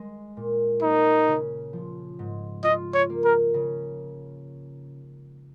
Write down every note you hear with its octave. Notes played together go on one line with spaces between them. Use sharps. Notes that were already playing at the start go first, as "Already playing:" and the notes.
Already playing: G#3
A#2
A#3 D#4
C#3
F3
G#2
F4 D#5
C#5
A#3
A#4
C#3